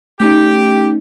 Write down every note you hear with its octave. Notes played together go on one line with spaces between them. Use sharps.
A3 C#4 D#4 G4